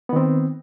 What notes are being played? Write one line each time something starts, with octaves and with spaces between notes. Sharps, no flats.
D#3 B3 C4